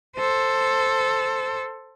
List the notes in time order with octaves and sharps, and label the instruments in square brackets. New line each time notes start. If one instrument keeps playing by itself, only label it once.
[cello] A4 C5